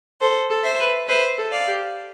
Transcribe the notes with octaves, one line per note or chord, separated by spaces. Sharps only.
A4 C5
A4
C5 E5
B4
B4 C5 E5
A4
D5 F5
G4